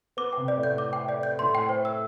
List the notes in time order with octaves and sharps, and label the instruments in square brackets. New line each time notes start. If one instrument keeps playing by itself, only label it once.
[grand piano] B3 [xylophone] D6
[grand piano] C3 [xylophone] G5
[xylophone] D5
[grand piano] A2
[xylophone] G6
D6
G5
D5
G6
[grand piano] A2 [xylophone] C6
[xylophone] G5
C5
E6